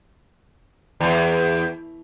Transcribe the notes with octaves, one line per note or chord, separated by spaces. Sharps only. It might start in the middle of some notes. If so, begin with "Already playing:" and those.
E2